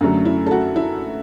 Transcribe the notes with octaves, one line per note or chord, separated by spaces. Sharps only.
F#2 D3 F#3 A3
E4
A4
F#4
E4